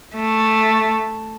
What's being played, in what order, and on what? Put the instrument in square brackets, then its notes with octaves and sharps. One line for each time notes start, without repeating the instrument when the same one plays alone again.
[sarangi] A3